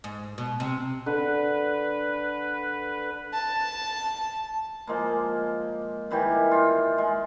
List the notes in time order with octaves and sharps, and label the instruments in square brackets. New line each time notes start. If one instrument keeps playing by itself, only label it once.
[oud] G#2
B2
C3
[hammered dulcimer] D3 [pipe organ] B4
[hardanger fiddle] A5
[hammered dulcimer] F3 G#3 A#3
D#3 E3 G3 G4
F4
G#3